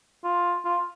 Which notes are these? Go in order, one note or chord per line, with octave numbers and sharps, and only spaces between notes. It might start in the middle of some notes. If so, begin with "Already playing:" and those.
F4
F4